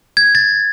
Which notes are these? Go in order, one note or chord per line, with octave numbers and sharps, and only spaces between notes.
G#6
A6